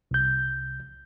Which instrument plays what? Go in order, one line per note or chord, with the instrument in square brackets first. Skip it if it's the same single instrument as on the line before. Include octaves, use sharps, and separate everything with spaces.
[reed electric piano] C2 G6